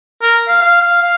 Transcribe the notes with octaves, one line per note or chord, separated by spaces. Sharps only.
A#4
F5
F5
F5
F5